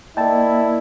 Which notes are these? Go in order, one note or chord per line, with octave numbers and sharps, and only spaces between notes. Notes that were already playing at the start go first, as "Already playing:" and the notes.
A#3 E4 A#4 D5 D#5 G5 A5